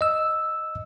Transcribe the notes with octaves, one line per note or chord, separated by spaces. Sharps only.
D#5 E6